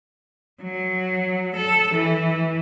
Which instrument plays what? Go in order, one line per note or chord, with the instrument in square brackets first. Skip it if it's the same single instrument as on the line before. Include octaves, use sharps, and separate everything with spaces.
[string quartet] F#3
A4
E3